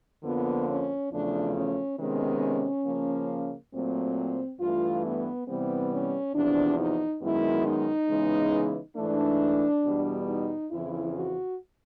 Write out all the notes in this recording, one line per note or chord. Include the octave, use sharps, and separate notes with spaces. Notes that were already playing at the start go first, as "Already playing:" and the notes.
F2 D3 F3 A#3 B3
C#4
E2 C#3 F3 A3 D4
C#4
C3 D#3 G#3 B3 C#4
C#3 F3 A#3
A#2 F#3 A3 C4
G2 E3 A3 F4
B3
C3 E3 G3 B3 C4
C#4
E2 C3 F3 D4
D#4
F#2 D#3 G#3 B3 E4
D#4
C#3 E3 G#3 B3
G#2 E3 A3 D4
E2 B2 G3
D#4
F2 C#3 E3 E4
F#4